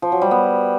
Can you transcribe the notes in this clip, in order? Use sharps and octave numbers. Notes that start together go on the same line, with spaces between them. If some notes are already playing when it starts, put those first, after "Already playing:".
F3
F#3
G3
B3